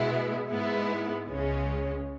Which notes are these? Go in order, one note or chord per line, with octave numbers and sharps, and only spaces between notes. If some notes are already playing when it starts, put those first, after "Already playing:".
Already playing: B2 G#3 B3 E4
G#2 G#3 B3 E4
C#2 C#3 G#3 C#4